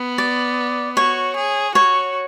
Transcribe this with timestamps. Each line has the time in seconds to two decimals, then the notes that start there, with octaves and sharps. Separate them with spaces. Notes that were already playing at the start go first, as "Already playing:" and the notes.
Already playing: B3
0.18 D5
0.97 F#4 C#5
1.36 G#4
1.75 F#4 C#5